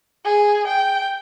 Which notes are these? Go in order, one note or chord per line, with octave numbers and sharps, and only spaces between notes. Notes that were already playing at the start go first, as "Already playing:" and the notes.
G#4
G5